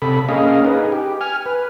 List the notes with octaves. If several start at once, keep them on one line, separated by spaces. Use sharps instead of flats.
C3 A4 B5
A#3 C#4 G#4 D#5 F5
D#4 G#4 B4
G4
G#5 F6
B4